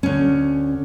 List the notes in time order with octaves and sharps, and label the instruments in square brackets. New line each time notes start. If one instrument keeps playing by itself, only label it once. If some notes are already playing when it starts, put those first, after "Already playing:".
[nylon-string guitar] D2 C#4